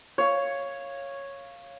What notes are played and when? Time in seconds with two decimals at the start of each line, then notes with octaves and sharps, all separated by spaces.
0.18 C#5 F5